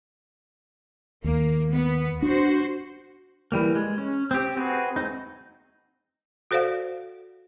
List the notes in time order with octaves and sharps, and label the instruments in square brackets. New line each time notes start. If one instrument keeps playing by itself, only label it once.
[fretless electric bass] D#2 [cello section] A#3
[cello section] B3
[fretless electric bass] D4 [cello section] F#4 C5
[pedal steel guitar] E3 G3 A#3
G#3
C#4
C4 G4
C4 F#4 G#4 B4
G#3 A#3 C4 D#4
[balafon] F#4 A4 C5 D5 F5 F#5